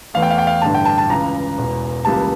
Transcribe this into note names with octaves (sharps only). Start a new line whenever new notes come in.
E2 E3 A3 F5
G5
F5
G5
F5
A1 G2 D3 A5
G5
A5
A5
C#2 C#3 E3 A#5
E1 E2 E3
C#2 C#3 E3 G3 A#3 A5